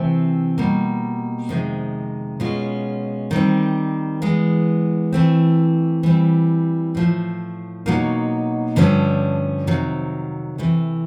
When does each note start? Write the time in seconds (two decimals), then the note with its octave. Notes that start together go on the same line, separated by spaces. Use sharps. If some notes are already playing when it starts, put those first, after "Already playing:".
Already playing: C3 E3 A3 C4
0.58 B2 G3 A#3
1.49 F2 C3 D#3 G#3
2.40 B2 G#3 C#4 F4
3.31 D#3 G3 C4
4.22 E3 G#3 B3
5.13 E3 A3 C4
6.03 E3 G3 C4
6.95 A2 F3 A3
7.86 B2 F#3 A#3 D#4
8.76 G2 D3 F3 A3 C#4
9.67 F2 C3 D#3 F#3
10.58 C3 E3 A3